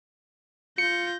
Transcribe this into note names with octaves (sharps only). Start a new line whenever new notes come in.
F4 G6 A#6 C#7